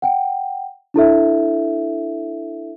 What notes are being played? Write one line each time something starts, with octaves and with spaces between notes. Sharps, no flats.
F#5 G5
D4 E4 A4 E5